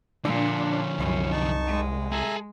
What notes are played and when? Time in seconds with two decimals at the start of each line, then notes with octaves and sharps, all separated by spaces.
0.25 A#2 D3 F3 D4
0.70 C#4
0.99 C2 F#2
1.31 D#4 A5 C#6
1.67 G#3
2.12 G#4 A4 E5 G#5 A#5